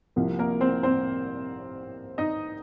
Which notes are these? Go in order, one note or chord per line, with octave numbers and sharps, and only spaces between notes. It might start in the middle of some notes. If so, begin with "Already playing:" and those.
C2 C3 F3 A#3
A#3 A#4
C4 C5
C4 C5
D#4 D#5